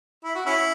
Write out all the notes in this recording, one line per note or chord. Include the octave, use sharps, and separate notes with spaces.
E4
F#4
C#4 E4